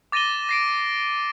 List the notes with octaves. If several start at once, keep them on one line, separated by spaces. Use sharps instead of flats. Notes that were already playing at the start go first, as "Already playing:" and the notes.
D6 A6 A#6 D#7 E7 G7
A#6 C7 D7